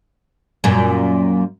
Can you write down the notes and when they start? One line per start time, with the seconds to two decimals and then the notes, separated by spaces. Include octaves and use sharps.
0.64 F#2 A#2